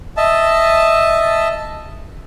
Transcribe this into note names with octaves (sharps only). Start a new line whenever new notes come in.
D#5 E5 A5